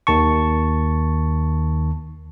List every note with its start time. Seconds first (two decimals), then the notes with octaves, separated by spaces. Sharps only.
0.07 D#2 D#3 A5 C#6